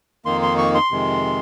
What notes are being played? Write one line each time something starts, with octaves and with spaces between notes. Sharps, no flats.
F2 D#3 A#3 D#4 C6
C6
C#6
C6
F2 C3 D#3 G#3